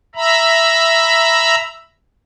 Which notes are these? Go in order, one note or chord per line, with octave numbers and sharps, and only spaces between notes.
E5 A#5 B5